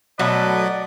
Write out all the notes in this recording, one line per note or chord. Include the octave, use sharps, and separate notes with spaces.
B2 F#3 A3 F#4 B4 D5 D#5